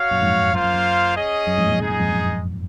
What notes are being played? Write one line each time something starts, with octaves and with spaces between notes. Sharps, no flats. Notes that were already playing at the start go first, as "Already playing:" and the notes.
Already playing: F#4 C#5 F5
F#2 A#2
F2 G#2
F#2 A#3 F4 C5 F5
F#2
F#2
C#4 G#4 D#5
F#2
F2 G#2
F#2 A#2
G#2 C3 G#3 D#4 G#4 D#5
F#2 A#2
F2 G#2
F#2